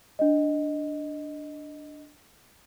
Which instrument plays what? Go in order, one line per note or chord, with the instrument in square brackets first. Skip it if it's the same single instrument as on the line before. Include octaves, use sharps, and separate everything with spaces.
[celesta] D4 D#5